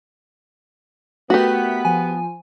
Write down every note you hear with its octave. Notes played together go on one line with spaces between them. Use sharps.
A3 B3 F#4 G4 A#4 B6
F3 G#5